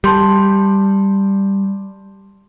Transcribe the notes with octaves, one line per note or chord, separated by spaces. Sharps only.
G3 A5 C6 G6